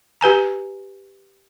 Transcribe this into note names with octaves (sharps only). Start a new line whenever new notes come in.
G4 B4 G#5 A#5